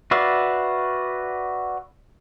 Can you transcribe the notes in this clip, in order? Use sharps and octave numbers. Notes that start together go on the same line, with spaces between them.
F#4 B4 D5 E5 F5